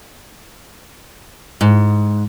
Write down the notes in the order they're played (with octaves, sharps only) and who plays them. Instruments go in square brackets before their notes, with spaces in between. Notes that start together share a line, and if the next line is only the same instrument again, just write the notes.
[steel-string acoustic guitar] G#2